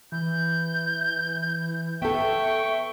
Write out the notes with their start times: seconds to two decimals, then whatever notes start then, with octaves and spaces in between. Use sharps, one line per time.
0.12 E3 G6
2.02 B3 A4 E5 G5 C#6